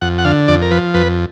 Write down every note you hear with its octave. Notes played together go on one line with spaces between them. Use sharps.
F2 F#5
F#5
D3 F5
F2 D5
A#4
F3 B4
F2 B4